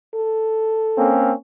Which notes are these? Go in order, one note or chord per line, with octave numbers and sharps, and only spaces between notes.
A4
A#3 C4 C#4